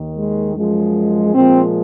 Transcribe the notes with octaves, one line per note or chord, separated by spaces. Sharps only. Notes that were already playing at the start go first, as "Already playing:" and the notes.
Already playing: D#2 D#3
G#3
F#2 F3 G#3
A#2 F3 G#3 C4